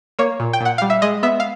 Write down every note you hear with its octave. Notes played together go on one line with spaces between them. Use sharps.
A#3 C#5
A#2
G5
A#2 F#5
G3 F5
E5
G#3 D#5
B3 E5
F5